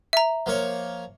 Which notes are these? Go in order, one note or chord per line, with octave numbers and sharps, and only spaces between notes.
E5 A#5
F3 A#3 C#5